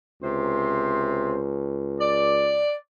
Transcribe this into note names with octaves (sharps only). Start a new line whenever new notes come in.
C#2 C3 C5 C6
D5